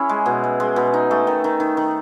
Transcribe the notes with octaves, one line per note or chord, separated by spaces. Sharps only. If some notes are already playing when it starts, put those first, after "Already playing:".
Already playing: C#4 E4 G#4
G#3
B2
G#3
G#3
B2
D#4
A3
D#3
D#3
D#3
D#3